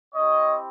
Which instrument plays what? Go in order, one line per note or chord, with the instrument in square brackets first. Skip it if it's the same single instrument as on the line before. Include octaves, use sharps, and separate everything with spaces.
[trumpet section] C4 E4 G4 C#5 D#5